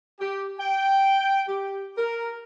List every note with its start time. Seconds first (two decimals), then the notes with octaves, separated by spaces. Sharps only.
0.20 G4
0.60 G5
1.49 G4
1.98 A#4